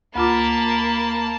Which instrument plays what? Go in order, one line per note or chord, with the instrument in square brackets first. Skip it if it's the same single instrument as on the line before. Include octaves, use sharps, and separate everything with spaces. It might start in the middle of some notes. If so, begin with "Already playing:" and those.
[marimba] D2 F4 D6 [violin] A#3 [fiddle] A5 [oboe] B5